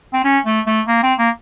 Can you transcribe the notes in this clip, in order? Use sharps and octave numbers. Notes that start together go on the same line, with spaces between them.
C4
C#4
A3
A3
A#3
C4
A#3